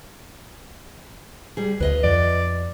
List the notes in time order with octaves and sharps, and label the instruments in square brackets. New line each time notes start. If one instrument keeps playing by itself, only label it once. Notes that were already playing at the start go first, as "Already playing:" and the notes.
[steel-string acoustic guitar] G3 G#4
[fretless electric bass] D2 [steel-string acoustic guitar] B4 D#5 F5
[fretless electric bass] F2 [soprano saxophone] D5